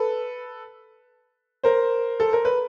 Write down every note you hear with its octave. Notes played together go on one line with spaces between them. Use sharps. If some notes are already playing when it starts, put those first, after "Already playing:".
Already playing: A4 B4
A#4 C5
A4
A#4
B4